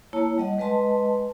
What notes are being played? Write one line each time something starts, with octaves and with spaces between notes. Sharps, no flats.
A#3 E4 C#5 A5
G3 D#5 F#5
G#3 B4 D#5 A5 C6